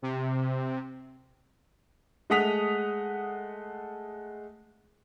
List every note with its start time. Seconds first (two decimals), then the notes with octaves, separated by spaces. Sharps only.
0.02 C3
2.30 G#3 A3 F#5 D#6 B6 F7